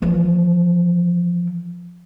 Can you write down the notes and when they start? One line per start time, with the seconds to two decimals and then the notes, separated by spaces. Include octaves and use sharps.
0.02 E3 F3